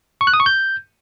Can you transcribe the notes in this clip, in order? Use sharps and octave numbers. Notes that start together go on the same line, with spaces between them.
C#6
F#6
D#6
C#6
G6